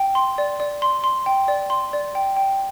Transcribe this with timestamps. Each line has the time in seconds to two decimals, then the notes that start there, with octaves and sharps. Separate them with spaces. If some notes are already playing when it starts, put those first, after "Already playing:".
Already playing: G5
0.15 C6
0.38 D5
0.60 D5
0.82 C6
1.04 C6
1.26 G5
1.48 D5
1.70 C6
1.93 D5
2.15 G5
2.36 G5